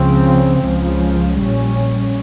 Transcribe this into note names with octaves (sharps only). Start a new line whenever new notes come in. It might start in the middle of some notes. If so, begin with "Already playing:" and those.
Already playing: C#2 C#3 F3 C4
C#2 C#3 F3
A#1 A#2 G3 C#4